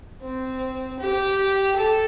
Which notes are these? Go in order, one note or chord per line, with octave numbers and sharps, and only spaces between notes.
C4
G4
A4